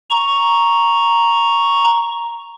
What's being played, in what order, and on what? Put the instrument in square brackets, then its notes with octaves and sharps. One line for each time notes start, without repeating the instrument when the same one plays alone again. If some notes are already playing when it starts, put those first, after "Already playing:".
[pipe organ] A#5 C#6